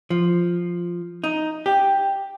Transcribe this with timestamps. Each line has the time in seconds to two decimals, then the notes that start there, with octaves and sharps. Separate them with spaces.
0.10 F3
1.24 D#4
1.66 G4